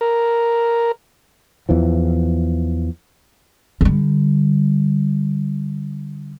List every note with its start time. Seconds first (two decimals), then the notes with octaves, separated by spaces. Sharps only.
0.01 A#4
1.69 E2 E3 F3
3.81 D3 G3